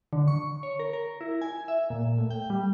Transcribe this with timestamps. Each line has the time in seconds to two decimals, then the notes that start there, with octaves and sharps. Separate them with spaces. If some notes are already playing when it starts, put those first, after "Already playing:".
0.13 D3
0.28 C#6
0.63 C#5
0.80 A#4
0.93 A#4
1.21 E4
1.42 G#5
1.68 E5
1.90 A#2
2.18 A2
2.31 G5
2.50 G3